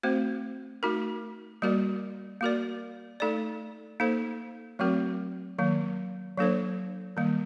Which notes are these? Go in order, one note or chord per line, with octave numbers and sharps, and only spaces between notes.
A3 C4 F#4 C5
A3 D#4 F#4 A#4
G3 A#3 F#4 A#4 D5
A#3 F#4 A#4 D5
A3 D#4 A4 D5
A#3 D#4 A4 C5
F#3 A3 C4 F#4 A#4
D#3 F#3 A#3
F#3 A#3 D4 A4 C5
D#3 G3 A#3